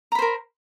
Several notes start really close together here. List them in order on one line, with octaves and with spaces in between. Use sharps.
A#5 B5 C5 A#4